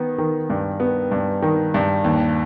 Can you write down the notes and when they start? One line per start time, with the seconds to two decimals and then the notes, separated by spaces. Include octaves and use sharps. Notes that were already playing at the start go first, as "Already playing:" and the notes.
Already playing: D#3 B3
0.18 D#3
0.50 G2
0.80 B3
1.12 G2
1.42 D#3
1.74 G2
2.04 D#2